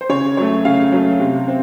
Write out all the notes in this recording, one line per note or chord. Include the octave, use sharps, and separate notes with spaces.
C5
C#3 C#5
F#3 A3 C#5
C#3 F5
F#3 A3
C3
C4